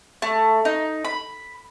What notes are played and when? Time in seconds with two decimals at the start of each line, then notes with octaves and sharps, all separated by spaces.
0.22 A3
0.65 D#4
1.05 B5